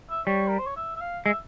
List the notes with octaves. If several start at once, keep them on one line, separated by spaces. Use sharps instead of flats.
E5
G3 C#5
A#4
C5
C#5
E5
E5
F5
G#3 E5